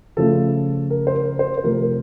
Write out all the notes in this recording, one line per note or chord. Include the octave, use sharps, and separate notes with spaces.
C#3 F3 A3 A4
A#4
C5
A#4
C5
C5
C3 F3 A3 A#4
A#4